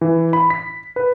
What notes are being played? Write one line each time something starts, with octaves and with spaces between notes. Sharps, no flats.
E3
B5
B6
B4